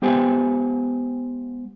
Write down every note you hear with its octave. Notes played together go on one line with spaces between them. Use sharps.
G#3 B3 G4 C5 G5 G#5